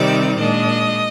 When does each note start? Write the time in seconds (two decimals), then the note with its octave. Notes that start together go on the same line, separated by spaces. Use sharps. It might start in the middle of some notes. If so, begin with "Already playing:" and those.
Already playing: C3 D#3 G3 C4 D#4 D5
0.40 A#2 G#3 D4 D#5